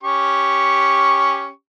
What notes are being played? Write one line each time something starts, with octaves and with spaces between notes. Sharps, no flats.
C#4 G4 C#6